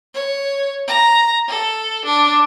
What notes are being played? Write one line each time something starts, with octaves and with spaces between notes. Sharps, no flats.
C#5
A#5
A4
D4